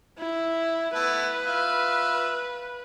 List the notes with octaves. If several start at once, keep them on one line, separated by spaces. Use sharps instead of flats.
E4
A3 B3 E4 B4
F4 E5 F5